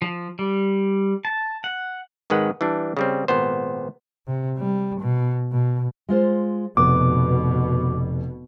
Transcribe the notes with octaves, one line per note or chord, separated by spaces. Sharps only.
F3
G3
A5
F#5
G#1 D#3 G#3 B4 F#5
E3 G3 D4
C#3 G3 C4
G#1 A#2 B3 C5
C3
G3
B2
B2
G#3 F4 C5
F1 D#2 B2 B3 D6